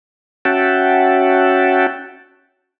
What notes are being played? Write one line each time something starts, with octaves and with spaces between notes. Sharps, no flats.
C#4 F#4 E5 F#5 G5 A5